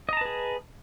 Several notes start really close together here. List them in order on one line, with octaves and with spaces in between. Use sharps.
D#5 A#5 A5 B4 G#4